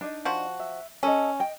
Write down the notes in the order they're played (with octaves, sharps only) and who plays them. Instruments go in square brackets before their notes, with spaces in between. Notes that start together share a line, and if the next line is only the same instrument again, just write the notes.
[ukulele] D4 D#4 D#5
[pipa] F3 F#4
[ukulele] E5
[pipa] C#4 [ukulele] A4 D#5
[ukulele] D#5 G5